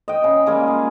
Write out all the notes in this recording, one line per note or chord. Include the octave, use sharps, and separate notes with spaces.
D#5 G5
C#3
G3 G#3 A#3 G#4
F4